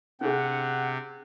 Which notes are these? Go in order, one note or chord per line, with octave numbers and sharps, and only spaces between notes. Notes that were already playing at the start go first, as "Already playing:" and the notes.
C3 C#4 D4 G#4 F#5